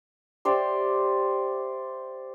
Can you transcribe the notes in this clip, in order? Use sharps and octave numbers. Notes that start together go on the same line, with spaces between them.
G4 C5 D5 E5